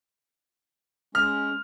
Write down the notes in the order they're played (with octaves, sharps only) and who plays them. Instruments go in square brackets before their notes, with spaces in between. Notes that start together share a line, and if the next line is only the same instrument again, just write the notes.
[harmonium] G#3 C#4 [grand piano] F6